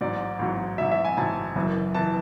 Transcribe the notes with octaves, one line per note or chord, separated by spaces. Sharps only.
A1 G#2 F#3 D5
A1 G#2 F#3
A1 G#2 F#3 E5
E5
G#5
A1 G#2 F#3 A5
F#1 F#2 E3
E3 A5